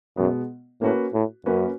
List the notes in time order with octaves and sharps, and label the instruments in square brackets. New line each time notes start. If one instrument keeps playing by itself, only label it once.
[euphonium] F#2 [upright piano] B2 G#3 B3
[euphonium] A2 [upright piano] A#3 C#4 F#4 B4
[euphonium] A2
[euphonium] F#2 [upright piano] A#3 C#4 F#4 B4